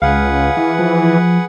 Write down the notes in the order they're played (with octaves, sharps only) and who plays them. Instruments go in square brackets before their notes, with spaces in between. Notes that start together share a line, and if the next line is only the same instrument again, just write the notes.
[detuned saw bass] C#2 [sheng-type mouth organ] G#4 B4 F#5 [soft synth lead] F5
[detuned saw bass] E3
[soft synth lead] F3